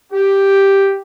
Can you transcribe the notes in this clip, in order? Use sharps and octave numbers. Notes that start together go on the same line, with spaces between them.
G4